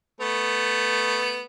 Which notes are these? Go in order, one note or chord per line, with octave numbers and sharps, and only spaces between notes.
A3 B3